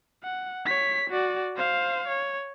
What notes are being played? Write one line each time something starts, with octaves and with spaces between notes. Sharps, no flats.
F#5
C#5 B6
F#4 D5
C5 F5
C#5